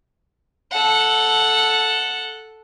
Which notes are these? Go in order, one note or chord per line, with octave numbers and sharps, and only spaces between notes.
A4 F#5